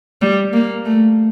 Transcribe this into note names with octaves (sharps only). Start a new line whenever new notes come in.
G3
A#3
A3